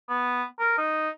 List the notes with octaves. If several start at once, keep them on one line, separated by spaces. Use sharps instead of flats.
B3
A#4
D#4